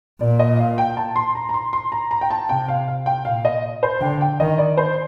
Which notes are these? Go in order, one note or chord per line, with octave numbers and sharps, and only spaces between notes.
A#2 D5
D#5
F5
G5
A5
C6
A#5
A#5
C6
C6
A#5
A#5
G5
A5
C3 G5
F5
F5
G5
A#2 F5
D#5
C5
D3 G5
G5
D#3 D#5
D5
C5